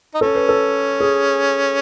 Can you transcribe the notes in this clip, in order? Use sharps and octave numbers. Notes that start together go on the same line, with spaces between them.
D#4
C#4 A4
B4
A4
G#4